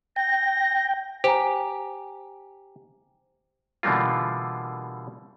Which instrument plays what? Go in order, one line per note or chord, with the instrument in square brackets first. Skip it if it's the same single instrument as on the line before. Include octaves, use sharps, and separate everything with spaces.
[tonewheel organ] G5 [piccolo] A#6
[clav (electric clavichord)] G4 [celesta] C5 G#5 A#5
[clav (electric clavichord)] B2 D3 E3 G3 A#3 F4